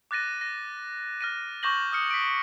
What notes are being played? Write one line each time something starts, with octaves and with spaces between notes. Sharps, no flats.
D6 F#6 A6 A#6 D#7
A#6
F6 A#6 D#7
C#6 D6 G6 A#6 F#7
D#6 F6 C#7
B6 D7